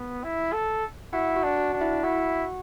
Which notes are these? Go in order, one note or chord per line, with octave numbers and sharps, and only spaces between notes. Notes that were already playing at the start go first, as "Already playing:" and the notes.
Already playing: B3
E4
A4
E4 F#4 F#5
F#4 F#5
D4
F#4 F#5
D4
E4 E5
E4 F#4 F#5